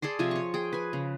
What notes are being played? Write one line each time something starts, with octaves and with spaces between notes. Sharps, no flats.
G#4 A4 D5 C6
C3 F3 F4 G#5
C#5 C#6
G#4 G5
B4 G#5
C#3